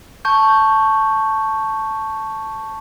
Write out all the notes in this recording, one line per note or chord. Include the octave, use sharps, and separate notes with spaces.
A5 C#6 G6